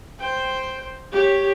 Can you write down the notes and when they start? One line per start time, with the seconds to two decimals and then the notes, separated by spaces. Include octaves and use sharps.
0.20 C5 G5
1.12 G4 C#5